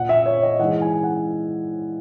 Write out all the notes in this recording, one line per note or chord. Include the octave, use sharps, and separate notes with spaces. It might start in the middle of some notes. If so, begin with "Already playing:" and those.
Already playing: A#2 F#5
E5
C#5
D#5
G#2 E3 F#5
G#5
F#5